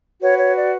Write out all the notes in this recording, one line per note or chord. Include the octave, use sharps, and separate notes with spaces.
F#4 B4 C#5
C#5
D5